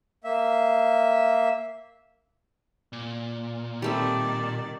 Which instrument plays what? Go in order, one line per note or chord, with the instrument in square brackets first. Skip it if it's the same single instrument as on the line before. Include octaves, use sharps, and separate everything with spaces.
[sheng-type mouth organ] A#3 E5
[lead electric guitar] A#2
[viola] D#3 D5 [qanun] G3 A3 C4